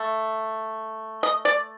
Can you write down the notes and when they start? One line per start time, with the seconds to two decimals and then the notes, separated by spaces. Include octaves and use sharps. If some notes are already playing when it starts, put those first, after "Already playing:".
Already playing: A3
1.23 D#5
1.45 D5